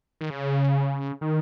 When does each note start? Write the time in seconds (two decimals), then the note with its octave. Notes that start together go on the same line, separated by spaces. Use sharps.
0.21 D#3
0.30 C#3
1.21 D#3